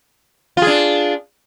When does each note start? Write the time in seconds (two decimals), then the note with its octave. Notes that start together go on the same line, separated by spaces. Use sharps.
0.57 F4
0.62 G#4
0.67 D4